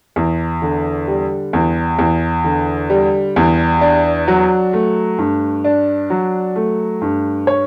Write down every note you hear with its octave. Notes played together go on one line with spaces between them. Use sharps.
E2
D3
G3
E2
E2
D3
G3
E2
D4
F#3
A3
G2
D4
F#3
A3
G2
C#5